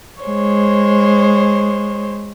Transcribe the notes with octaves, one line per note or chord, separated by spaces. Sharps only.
G#3 C5 C#5